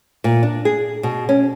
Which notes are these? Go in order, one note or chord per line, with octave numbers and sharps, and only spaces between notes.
A#2
D4
G#4
B2
C#4